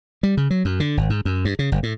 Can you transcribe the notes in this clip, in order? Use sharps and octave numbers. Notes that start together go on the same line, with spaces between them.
G3
C#3
F#3
F#2
D3
G#1
G#2
F#2
G2
C#3
G1
A2